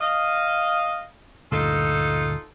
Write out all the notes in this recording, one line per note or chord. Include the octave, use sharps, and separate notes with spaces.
D#5 F5
D2 G2 A#2 D#4 F4 A4